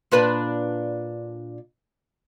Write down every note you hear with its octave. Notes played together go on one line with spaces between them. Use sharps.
A#2 D4 B4